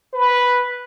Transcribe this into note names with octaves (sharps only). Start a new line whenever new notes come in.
B4